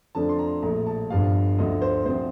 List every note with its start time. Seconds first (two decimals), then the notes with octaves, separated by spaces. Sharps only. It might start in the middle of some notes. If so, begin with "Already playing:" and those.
0.15 F2 D3 F3 A3 D4 A5
0.29 C6
0.39 A#5
0.62 A#1 A2 F3 A3 A#5
0.86 A5
1.10 G1 G2 F3 A3 F5
1.58 D2 D3 F3 D#5
1.82 C5
2.05 D2 C3 F3 C4 C5